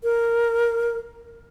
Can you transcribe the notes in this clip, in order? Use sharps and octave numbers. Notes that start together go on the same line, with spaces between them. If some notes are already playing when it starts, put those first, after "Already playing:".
A#4